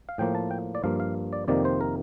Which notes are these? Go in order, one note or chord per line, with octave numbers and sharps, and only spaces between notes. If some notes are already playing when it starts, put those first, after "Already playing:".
F5
A2 F3 A#3 G5
A5
G5
D5
G2 F3 A#3 F5
F5
D5
F2 C3 D#3 A#3 D5
C5
A#4